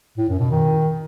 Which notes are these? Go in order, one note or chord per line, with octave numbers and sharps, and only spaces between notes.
A2
F#2
B2
D#3